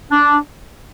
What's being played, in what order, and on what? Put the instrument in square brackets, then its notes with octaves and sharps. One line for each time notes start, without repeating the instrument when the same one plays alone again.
[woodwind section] D4